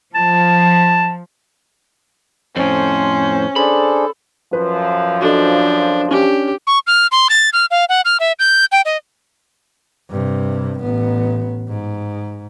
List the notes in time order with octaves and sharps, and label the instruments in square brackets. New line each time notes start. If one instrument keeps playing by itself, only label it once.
[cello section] F3 [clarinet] A5
[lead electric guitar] F2 A2 [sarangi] C#4 [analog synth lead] C5
[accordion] D4 G#4 C5 [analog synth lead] A4 [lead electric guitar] B5
[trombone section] F#2 F3 [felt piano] B4
[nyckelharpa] D4 [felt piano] F#4 A4 D#5
[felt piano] C#4 D4 [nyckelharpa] G4
[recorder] C#6
F6
C6
A6
F6
F5
F#5
F6
E5
G6
G5
D#5
[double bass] G2 C3
A1 B3
G#2